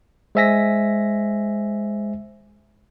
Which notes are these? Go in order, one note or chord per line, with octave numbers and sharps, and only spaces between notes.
G#3 C5 E5 G#5 A#6 B6